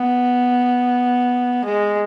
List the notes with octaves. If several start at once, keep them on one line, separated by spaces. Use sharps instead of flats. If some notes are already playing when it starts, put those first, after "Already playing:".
Already playing: B3
G#3